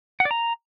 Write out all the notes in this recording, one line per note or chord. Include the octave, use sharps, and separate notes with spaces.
F#5
D5
A#5